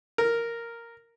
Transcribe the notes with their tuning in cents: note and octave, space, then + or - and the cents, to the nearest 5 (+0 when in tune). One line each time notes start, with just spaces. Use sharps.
A#4 -5